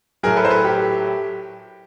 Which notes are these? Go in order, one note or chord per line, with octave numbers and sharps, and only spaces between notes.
A2 F#3 G#4 A#4
A4 B4
C5
A4 B4
G4